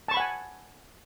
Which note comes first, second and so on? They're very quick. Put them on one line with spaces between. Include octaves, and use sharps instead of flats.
A5 C#6 B5 F#5 G#5